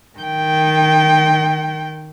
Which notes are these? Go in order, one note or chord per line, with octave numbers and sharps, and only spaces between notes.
D#3 G5